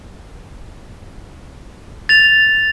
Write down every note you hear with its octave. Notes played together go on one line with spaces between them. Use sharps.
A6 F7